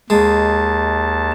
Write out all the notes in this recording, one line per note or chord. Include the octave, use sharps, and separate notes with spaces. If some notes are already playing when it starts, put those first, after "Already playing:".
D#2 G#3 A5